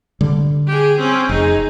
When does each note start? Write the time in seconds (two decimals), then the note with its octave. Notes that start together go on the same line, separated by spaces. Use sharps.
0.21 D3 G3
0.68 G4 G#4
0.99 C4 C#4
1.29 F1 D#4 G#4